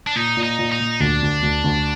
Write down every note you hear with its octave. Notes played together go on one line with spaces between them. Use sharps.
D4
A#2 D#4
A#2
D#4
A#2
D#4
A#2
D2 D4
D2
D2
D2